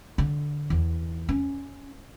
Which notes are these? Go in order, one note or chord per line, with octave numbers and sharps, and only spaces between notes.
D3
E2
C#4